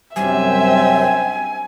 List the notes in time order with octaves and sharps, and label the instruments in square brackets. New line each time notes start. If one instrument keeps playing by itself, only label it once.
[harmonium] F#2 C3 F#3 [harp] G3 D4 [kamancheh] C4 E5 [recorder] G#5